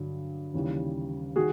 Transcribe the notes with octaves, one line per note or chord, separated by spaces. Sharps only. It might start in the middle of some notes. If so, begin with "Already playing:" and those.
Already playing: G2 D3 F#3
D#2 C#3 E3 G3
D#3 G3 F#4 G#4